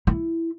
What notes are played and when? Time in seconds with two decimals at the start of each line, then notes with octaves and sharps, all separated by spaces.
0.07 E4